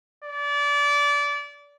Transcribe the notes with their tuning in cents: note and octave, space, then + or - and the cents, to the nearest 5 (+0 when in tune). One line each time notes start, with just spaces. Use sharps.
D5 -25